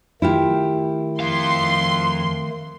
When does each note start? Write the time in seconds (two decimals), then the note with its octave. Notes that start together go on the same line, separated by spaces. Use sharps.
0.22 D#3 A3 E4 F4 G4
1.20 F2 F5 C6